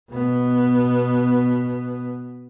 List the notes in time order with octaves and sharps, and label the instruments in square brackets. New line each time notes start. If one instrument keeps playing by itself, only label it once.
[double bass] B2 B3